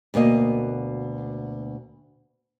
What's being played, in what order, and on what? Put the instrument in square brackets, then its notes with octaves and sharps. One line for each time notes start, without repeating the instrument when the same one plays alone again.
[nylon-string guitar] D2 B2 A#3 D#5